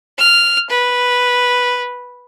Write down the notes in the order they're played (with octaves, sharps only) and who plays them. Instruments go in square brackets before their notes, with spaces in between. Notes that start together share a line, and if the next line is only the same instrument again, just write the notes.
[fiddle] F6
B4